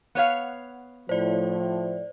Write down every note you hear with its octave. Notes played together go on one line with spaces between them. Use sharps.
B3 C#5 F5
A2 F3 C5 D5